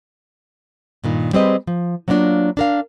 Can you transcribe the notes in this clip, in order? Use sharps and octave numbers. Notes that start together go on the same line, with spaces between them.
G2 A#2 D#3
G3 G#3 C4 G4 B4 D#5
F3
F#3 A#3 B3 C#4 D4 F4
D4 A#4 F5